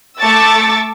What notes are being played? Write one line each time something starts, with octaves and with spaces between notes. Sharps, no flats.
A3 A5 C#6 D6 E6 A6